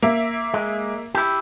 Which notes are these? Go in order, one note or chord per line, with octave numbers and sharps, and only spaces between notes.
A#3 E5
G#3
E4 G4